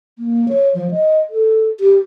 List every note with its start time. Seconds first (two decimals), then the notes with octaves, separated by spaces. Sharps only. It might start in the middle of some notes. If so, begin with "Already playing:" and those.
0.19 A#3
0.48 C#5
0.75 F3
0.91 D#5
1.30 A4
1.80 G4